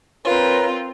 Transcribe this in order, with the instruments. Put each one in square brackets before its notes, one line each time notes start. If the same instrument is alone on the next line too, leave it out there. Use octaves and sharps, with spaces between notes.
[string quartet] C4 F4 [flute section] A#4 B4 C#5